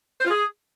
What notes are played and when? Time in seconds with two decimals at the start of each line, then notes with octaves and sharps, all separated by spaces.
0.20 C5
0.25 F4
0.30 G#4